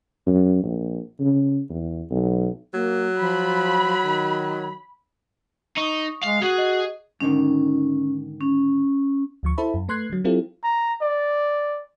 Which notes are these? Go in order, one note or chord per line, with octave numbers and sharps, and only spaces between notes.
F#2
A#1
C#3
E2
B1
F#3 A#3
F3 B5
D#3
D#4 C#6 D#6
G#3 F5
F#4 G#4 D#6 C7 D#7
D#5
G#2 D3 D#3 C#4
C#4
D2 F3 C#6
E4 A4 C5 E5 A5 B5
F#2
A3 B4 C6 F#6 G#6 C7
D3 F#3
F#3 C4 E4 F4 G4 A4
A#5
D5